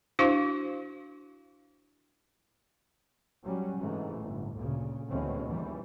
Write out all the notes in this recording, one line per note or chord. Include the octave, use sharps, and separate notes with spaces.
D4 E4 F#4 C5 F5 C#6
F#3 G3 C#4
G#2 C3 E3 A3
G1 A2
D2 A#2 C#3
D2 B2 E3 G#3 C4 C#4
D#2 G#2 E3 G3